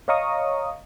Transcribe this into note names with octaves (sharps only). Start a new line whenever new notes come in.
C#5 D#5 F5 A#5 C#6 D#6